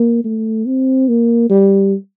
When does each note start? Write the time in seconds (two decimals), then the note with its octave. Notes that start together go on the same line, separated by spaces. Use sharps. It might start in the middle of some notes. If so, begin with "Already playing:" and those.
Already playing: A#3
0.24 A3
0.66 C4
1.08 A#3
1.50 G3